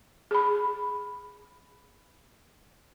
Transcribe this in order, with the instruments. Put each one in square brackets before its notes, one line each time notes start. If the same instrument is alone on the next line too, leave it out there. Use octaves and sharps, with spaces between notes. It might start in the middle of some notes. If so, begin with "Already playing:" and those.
[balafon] G#4 B5